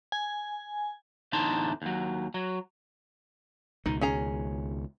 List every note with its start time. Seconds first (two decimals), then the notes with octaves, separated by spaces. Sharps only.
0.12 G#5
1.33 E2 A2 D3 D#4 A5 C6
1.82 D#2 F#3
2.34 F#3
3.86 C#2 B2 D#3 D#4
4.01 C#4 G#4 A#5